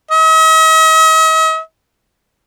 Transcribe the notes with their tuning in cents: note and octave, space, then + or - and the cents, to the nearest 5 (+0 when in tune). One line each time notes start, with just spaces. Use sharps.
D#5 +45